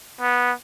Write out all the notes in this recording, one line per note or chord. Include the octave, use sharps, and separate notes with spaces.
B3